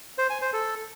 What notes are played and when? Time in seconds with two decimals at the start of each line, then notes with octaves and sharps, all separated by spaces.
0.18 C5
0.30 G#5
0.42 C5
0.53 A4